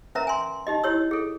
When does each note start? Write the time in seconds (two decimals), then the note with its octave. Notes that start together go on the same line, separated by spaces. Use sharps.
0.15 C#4 A#4 B4 E5 A#5
0.27 G#5 C6
0.67 D#4 G4 D#5
0.84 E4 G4 C#5 E6
1.11 G#4 A4